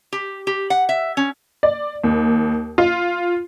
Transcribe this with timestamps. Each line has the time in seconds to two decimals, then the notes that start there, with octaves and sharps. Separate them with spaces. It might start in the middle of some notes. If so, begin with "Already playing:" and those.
0.13 G4
0.47 G4
0.70 F#5
0.89 E5
1.17 C#4
1.63 D5
2.04 D#2
2.78 F4